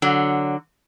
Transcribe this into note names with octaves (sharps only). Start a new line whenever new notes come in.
D3 F#3